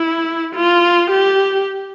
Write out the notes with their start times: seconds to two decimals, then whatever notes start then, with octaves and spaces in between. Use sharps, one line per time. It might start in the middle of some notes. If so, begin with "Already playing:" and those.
Already playing: E4
0.56 F4
1.10 G4